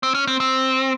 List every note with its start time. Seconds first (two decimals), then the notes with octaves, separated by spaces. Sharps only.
0.03 C4
0.15 C#4
0.27 C4
0.40 C4